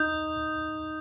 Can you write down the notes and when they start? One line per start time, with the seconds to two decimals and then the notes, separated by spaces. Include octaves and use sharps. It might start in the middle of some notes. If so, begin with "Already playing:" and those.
Already playing: D#4 D#6 G6